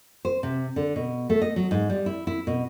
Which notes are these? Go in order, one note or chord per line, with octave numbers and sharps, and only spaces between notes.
C5
C3
D3
B2
A3
D#5
F#3
G#2
G3
E4
E4
B2